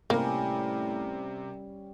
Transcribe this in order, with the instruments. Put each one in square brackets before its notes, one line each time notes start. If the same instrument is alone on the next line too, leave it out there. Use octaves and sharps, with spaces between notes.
[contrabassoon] A2 [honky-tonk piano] C3 A#4 [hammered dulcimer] G3 C#4 [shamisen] A#3